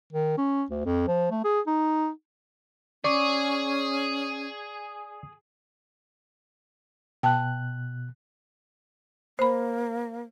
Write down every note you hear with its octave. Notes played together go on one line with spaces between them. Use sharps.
D#3
C#4
D2
F2
F3
A3
G#4
D#4
C#4 G#4 D5 C#6 D6
B2 G5 A5 F#6
A#3 C5 B5